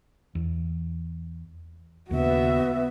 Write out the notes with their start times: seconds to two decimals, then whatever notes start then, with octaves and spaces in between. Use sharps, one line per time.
0.35 E2
2.11 D#2 C#3 B3 F#4 E5